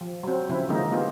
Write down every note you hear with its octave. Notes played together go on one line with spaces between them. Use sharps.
F3
F#3 C4
C#3 F3 C4 E4
D3 D#3 F3 G#3 A#3 D#4
A#3 B3 F4 G4 G#4